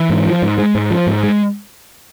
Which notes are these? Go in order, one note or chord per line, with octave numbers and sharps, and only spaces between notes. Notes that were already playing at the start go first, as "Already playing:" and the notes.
Already playing: E3
G#2
F3
G#2
G#3
G#2
F3
G#2
G#3